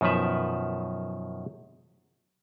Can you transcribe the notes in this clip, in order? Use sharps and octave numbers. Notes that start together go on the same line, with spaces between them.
F#2 B2 D#3 F3 B4 E5